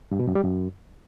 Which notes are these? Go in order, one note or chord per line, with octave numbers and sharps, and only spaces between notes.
G2
B2
F#2
G3
F#2